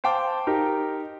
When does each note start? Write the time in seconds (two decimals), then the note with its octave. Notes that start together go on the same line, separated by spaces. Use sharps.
0.04 C5 F5 G5 A5 D6
0.47 D#4 G4 A#4